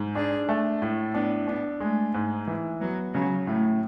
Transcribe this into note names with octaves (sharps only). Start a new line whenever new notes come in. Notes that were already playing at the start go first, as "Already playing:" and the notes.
Already playing: G#2
D4 G#4
A3
A2
B3 D4
B3 D4
G#3 A3
G#2
E3
F#3 B3
C#3 F#3
A2 A3